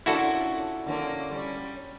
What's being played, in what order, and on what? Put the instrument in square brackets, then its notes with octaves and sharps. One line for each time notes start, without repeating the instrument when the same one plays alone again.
[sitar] A#2 C#4 D4 [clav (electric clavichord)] E4 F#4 A4
[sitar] D3 A#3 C#4
G3 C#4